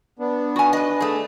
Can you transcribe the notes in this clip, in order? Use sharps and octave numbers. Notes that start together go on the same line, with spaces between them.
B3 D4
F#4 G#5
B4 D#5
A3 G#4